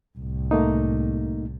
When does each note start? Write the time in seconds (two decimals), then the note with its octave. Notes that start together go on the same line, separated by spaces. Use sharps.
0.18 C2 A2
0.51 A3 A#3 D#4